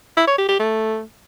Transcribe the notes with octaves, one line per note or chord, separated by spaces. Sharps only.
E4
C#5
G4
G4
A3